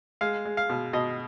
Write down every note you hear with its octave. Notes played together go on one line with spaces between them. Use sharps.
G#3 F5
G#3
F5
B2
B2 D#5